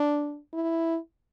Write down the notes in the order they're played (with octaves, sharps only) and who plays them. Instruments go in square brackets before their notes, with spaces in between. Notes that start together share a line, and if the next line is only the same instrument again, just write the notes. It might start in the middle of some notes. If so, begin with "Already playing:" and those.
Already playing: [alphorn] D4
E4